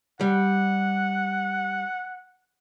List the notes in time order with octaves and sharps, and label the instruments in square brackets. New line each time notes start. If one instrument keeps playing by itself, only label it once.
[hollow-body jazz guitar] G3 [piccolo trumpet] F#5